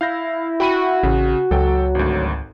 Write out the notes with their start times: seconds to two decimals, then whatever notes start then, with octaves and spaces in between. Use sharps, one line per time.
0.01 E4 F5 G6 A#6
0.60 F#4 G5 B5 D#7
1.03 A1 C#3
1.51 C#2 F#3 A4 G5
1.95 G#1 D2